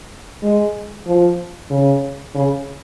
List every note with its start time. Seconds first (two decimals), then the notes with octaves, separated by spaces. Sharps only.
0.43 G#3
1.07 F3
1.70 C#3
2.35 C#3